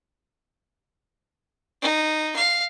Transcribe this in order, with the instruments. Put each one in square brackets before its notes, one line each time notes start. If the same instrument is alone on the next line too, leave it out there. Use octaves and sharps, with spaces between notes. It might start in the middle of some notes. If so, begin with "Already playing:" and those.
[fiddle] D#4
F5